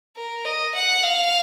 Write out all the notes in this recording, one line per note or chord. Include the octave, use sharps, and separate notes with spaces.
A#4
D#5
F#5
F5